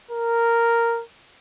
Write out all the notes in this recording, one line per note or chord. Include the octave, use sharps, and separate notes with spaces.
A#4